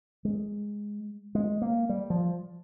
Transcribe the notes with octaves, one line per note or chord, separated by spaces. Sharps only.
G#3
G#3
A#3
G3
F3